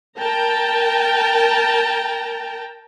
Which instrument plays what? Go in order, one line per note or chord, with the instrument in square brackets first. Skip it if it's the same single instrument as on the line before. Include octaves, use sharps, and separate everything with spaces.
[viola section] A#4 G5 A5 A#5